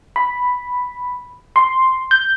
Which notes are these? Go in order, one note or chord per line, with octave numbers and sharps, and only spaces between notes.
B5
C6
G6